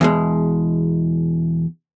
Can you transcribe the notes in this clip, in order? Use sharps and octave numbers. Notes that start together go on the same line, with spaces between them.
E2 B2 G#3